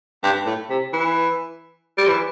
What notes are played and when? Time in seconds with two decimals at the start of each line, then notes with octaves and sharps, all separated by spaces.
0.23 G2
0.46 A2
0.70 C3
0.93 E3
1.98 G3
2.08 E3